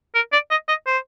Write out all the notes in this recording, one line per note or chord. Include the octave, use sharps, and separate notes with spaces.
A#4
D5
D#5
D#5
C5